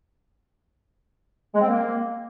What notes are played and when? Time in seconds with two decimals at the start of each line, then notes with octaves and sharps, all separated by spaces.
1.55 G#3
1.61 C4
1.68 A#3